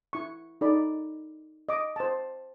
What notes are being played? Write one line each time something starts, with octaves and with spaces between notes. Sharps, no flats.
E4 C#6
D#4 A4 D5 B5
D#5 D6
C5 A5